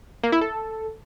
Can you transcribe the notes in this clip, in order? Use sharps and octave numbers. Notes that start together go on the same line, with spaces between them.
A#3
E4
A4